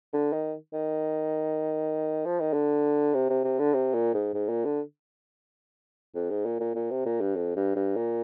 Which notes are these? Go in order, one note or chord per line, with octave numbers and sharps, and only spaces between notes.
D3
D#3
D#3
F3
D#3
D3
C3
C3
C3
D3
C3
A#2
G#2
G#2
A#2
D3
F2
G#2
A#2
A#2
A#2
C3
A#2
G2
F2
G2
G2
A#2